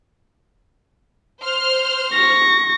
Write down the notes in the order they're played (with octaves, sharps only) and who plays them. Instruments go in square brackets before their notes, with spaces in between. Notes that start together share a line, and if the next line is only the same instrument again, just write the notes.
[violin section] C5 F6
[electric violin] C#6 A#6